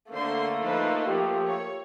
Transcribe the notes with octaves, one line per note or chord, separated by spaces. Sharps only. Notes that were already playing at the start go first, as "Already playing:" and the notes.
D3 A3 A#3 C5 C6
F3 D#4 B4 C5
F3 G4
C#5